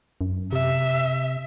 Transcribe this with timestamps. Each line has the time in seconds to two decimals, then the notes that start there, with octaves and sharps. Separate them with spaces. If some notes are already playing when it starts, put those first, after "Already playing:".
0.21 F#2
0.53 C3 E5